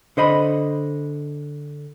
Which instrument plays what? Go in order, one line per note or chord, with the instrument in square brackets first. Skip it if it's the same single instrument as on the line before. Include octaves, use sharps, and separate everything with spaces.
[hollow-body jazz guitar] D3 C5 D#5 B5